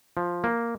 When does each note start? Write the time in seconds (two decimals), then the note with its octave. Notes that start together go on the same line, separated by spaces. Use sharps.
0.17 F3
0.44 A#3